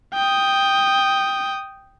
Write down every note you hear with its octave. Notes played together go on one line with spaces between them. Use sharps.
G5 D#6